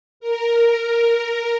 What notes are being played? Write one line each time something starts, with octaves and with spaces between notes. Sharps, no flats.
A#4